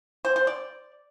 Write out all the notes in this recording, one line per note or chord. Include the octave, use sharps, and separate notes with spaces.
C5
C5
D5